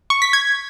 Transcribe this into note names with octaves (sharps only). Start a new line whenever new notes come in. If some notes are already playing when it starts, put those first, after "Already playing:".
C#6
B6
G#6